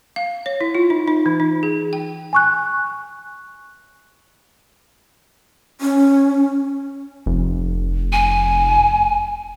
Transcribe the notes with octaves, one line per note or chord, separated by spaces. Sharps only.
F5
C#5
E4
F4
D#4
D#4
E3
D#4
G#4
G5
G#5 C#6 F#6
C#4
F1
G#5